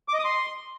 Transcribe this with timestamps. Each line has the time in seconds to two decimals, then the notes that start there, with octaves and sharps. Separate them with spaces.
0.08 D6
0.14 D#5
0.19 D#6
0.25 C6